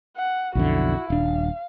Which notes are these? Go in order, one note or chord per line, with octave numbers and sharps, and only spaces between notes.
F#5
B1 F2 D3 E4 F#4
D#1 D4 F5